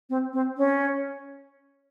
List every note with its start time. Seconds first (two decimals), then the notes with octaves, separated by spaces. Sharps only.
0.10 C4
0.33 C4
0.57 C#4